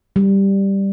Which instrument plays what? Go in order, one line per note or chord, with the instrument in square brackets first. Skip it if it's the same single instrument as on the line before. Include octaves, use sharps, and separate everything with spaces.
[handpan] G3